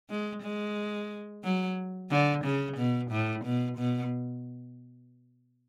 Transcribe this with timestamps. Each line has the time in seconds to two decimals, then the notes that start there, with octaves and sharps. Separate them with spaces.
0.10 G#3
0.43 G#3
1.44 F#3
2.11 D3
2.45 C#3
2.78 B2
3.11 A2
3.45 B2
3.78 B2